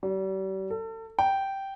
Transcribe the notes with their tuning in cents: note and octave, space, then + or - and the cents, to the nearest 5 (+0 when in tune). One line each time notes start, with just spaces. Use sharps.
G3 -40
A4 +35
G5 -10